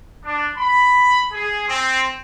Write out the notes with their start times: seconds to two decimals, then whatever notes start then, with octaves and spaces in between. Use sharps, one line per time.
0.24 D4
0.58 B5
1.32 G#4
1.68 C4